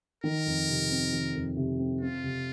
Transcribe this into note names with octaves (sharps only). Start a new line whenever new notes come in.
D#3 A#4
F2
C3
C4
D#3
F2
C3
C4
C4 F4
C3